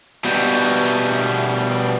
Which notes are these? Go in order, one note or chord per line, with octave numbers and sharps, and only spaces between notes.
B2 G3